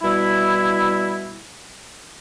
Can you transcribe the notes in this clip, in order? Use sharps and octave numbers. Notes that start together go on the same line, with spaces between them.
B2 G3 E4